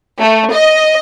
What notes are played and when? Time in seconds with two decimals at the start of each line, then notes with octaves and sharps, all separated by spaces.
0.19 A3
0.52 D#5